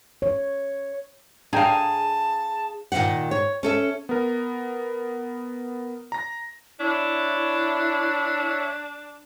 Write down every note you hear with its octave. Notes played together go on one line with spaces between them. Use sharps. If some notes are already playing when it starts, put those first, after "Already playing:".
C#5
D4 G#4 F5 G5 A5 A#5
A#2 D#3 B3 F5 F#5
C#5
C#4 A4 E5
B3 A#4
A#5 A#6
D4 E4 C#5 E5